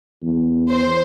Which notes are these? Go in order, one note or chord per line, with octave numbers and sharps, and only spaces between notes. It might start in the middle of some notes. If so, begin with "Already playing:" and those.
E2
C5